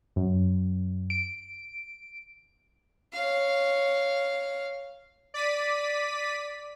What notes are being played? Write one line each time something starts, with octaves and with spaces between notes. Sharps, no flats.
F#2
D7
C#5 F5
D5 B6 D#7